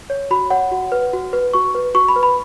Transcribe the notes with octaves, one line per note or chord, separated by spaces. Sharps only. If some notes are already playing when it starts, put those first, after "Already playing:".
C#5
F#4 B5
C#5 F#5
F#4
B4
F#4
B4
F#4 C#6
B4
F#4 C#6
B5
B4
B5